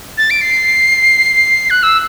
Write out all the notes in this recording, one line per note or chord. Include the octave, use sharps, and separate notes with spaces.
A6
D7
C7
F#6
E6